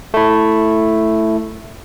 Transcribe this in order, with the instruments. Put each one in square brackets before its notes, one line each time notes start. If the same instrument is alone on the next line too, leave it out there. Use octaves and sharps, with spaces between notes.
[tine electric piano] A3 E4